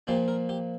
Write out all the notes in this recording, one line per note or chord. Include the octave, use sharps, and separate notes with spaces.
A#2 F3 A#3 D4 G4
A#4
G4